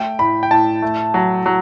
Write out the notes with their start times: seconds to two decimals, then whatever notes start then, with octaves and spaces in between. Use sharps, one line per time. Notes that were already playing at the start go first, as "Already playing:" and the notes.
Already playing: A3 G5
0.19 A2 B5
0.43 G5
0.51 A2 A5
0.82 A3
1.14 F#3
1.46 F#3